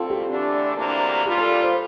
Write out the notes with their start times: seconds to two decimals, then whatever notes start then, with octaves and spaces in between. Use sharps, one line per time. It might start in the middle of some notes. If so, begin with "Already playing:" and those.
Already playing: D2 G3 C4 F4 A4
0.10 G4
0.27 E2 D3 A3 D4
0.76 D2 C3 E3 A#3 D4
1.25 A#2 G3 D4 F4 G4
1.38 A4
1.63 C5